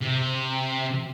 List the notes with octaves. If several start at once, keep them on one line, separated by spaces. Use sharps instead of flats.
C3